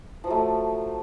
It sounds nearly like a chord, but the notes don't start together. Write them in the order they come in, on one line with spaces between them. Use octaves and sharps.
F3 F#3 A3